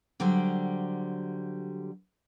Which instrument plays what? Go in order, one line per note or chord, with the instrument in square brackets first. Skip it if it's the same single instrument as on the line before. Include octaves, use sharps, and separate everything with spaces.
[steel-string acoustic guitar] D3 F#3 G3 G4 C5